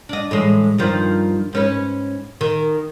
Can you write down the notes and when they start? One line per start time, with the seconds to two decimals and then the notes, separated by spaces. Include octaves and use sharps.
0.09 D4 D#5
0.31 A2 E3 G#3
0.78 G2 D#3 F3
1.53 G#2 C#4 B4
2.41 D#3